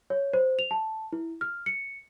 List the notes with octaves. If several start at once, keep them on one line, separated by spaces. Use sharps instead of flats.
C#5
C5
F7
A5
E4
F6
C#7